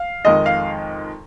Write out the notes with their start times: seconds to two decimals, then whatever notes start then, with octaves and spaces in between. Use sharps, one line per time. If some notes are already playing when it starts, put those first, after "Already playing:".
Already playing: F5
0.25 F2 D#3 G#3 D#5
0.46 F5